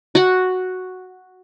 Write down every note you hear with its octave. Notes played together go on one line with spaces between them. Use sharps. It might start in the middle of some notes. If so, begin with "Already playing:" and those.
F#4 F#5